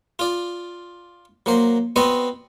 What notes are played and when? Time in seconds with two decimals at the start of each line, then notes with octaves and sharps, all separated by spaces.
0.19 F4 D5
1.46 F#3 A#3 C5
1.96 B3 C4 F#4 C5 D5 D#5